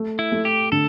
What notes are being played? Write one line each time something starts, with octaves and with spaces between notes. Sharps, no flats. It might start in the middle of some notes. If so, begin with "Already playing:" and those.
Already playing: A3
E4
A3
G4
D3 A4